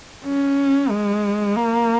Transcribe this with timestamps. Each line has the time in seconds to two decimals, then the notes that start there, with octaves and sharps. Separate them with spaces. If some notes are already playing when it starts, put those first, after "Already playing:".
0.25 C#4
0.90 G#3
1.56 A#3